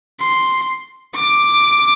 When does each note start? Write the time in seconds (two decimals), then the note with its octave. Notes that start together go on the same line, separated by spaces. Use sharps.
0.20 C6
1.15 D6